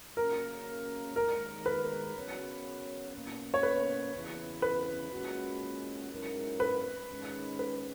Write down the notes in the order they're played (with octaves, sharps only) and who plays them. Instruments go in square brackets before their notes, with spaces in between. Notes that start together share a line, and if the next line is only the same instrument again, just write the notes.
[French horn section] C#3 F#3 A#3 C#4 [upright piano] A#4
[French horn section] D#2 D#3 G#3 [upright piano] A#4
[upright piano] B4
[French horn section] C#3 F#3 B3 F#4 C#5
B2 A#3 C#4
[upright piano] C#5
B4
[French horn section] E2 C#3 E3
[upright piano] B4
[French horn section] A#2 G#3 C#4 F#4
G#2 F#3 C#4 E4 A#4
[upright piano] B4
[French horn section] G#2 D#3 G#3 C#4
[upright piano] B4